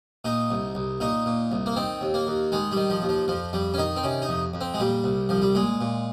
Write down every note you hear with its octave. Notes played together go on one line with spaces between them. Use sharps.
A#2 D#4
C2
C2
A#2 D#4
A#2
C2
A#3
D#3 C4
D#2
A#3
D#2
D#3 G#3
G3
D#3
F3
D#2
F3
F2 F3
F2 G3
C#4
D#3 D#4
C4
C3 C#4
D#4
F2
F2
C4
G#3
A#2 G3
C2
C2 F3
G3
A#2 G#3
A#2